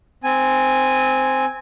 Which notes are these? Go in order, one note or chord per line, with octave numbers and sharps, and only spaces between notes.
C4 G#5